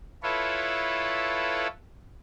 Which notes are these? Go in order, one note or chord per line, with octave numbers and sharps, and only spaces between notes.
E4 F4 A4 B4 C#5